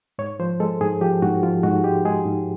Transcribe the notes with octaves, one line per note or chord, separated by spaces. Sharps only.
G#2 C#5
F3 C5
G#3 A4
G#2 G#4
F3 G4
G#2 F#4
F3 F4
G#2 F#4
G#3 G4
G#3 G#4
G#2